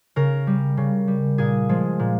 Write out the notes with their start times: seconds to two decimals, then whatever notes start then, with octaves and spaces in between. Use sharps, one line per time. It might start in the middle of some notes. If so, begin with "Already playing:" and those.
0.16 C#3 A#4
0.47 G3
0.77 C#3
1.08 G3
1.38 A#2 G#4
1.69 F3 G#3
1.99 A#2